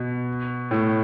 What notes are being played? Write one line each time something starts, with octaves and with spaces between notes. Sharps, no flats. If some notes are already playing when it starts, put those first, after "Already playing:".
Already playing: B2
A2